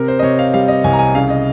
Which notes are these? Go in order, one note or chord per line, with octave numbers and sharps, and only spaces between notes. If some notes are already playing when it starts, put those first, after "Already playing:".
Already playing: C3 A#4
C5
D#5
C3 C#5
F5
G3 F5
D#5
C2 G#5
A#5
G#5
C#3 F5
D#5